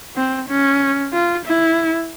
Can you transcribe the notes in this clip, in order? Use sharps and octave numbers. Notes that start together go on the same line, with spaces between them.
C4
C#4
F4
E4